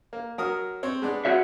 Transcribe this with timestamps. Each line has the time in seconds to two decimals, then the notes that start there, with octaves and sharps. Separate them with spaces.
0.13 A#3
0.38 F#3 A#4 D#6
0.83 C4 C#5
1.02 G#3 B3 D4
1.25 F#4 C#5 E5